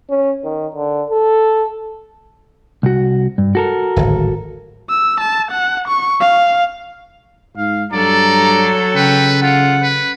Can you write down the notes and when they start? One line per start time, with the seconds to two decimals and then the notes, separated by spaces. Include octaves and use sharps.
0.10 C#4
0.44 D#3
0.75 D3
1.11 A4
2.83 C2 F#4
3.38 G2
3.55 F#4 A4 A#4
3.96 D1 G#1
4.89 E6
5.21 A5
5.51 F#5
5.88 C#6
6.20 F5
7.57 G#2 F5
7.92 G2 F#3 A4 D5 A#5
8.95 C#3 B4 G5
9.43 F4 F#5
9.82 B4